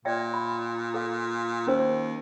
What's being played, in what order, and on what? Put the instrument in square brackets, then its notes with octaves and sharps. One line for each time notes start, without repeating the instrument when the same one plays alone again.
[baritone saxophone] A#2 [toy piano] D5 E5 G5
[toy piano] B5
A4 F5
[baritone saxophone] D#2 [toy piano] C#4 A#4 C5